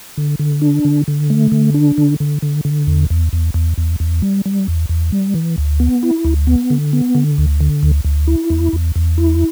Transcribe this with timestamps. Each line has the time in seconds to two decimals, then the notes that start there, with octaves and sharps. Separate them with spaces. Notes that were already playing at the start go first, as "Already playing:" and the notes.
0.17 D3
0.39 D3
0.62 D4
0.85 D3
1.08 D3
1.30 A3
1.52 D3
1.74 D4
1.98 D3
2.20 D3
2.42 D3
2.65 D3
2.87 E2
3.10 E2
3.33 E2
3.54 E2
3.78 E2
4.00 E2
4.22 G3
4.45 G3
4.68 E2
4.89 E2
5.12 G3
5.34 E3
5.58 D2
5.80 B3
6.03 E4
6.25 D2
6.47 B3
6.70 D3
6.93 B3
7.15 D3
7.38 D2
7.60 D3
7.83 D2
8.04 D2
8.27 E4
8.50 E2
8.73 E2
8.96 E2
9.18 E4